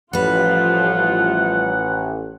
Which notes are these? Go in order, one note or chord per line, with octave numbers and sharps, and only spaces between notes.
A1 F3 G3 F4 B4 F#5